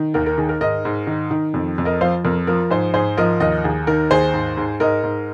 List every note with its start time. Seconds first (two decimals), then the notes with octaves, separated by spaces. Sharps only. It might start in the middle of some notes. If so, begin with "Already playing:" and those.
Already playing: D#3
0.14 D#2 A#4
0.26 A#4
0.38 D#3 G#4
0.49 A#4
0.61 G#2 A#4 D#5
0.85 G#2
1.07 D#3
1.31 D#3
1.54 F2
1.78 F2
1.85 A#4 D#5
2.01 F3 C5 F5
2.24 F2 A#4
2.47 F3 A#4
2.70 G#2 G#4 C5
2.94 G#2 G#4 C5
3.17 F3 A#4 D#5
3.40 D#2 A#4 D#5
3.64 D#2 G#4
3.87 D#3 A#4
4.11 D#2 G#4 C5
4.34 G#2
4.57 G#2
4.80 G#2 A#4 D#5
5.03 G#2